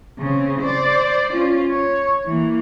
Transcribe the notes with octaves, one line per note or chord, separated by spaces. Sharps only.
C#3 C4
C5 D5
C#4 F4
C#5
E3 A#3